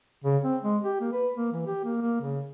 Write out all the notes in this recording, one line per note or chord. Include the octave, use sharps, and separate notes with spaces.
C#3
C4
G#3
G4
A#3
B4
A#3
E3
G4
A#3
A#3
C#3